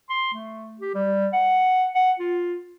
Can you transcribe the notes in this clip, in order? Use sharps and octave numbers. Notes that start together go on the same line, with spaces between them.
C6
A3
G4
G3
F#5
F#5
F4